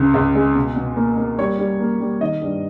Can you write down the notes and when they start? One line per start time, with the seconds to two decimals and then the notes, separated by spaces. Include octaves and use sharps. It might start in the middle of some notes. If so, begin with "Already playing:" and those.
Already playing: C#2 C#3
0.14 C#2
0.35 G#3
0.55 B2
0.76 B2
0.97 A#3
1.17 A#3
1.38 G3 C#5
1.59 G3
1.80 A#3
2.00 G3
2.20 D#3 D#5
2.42 G2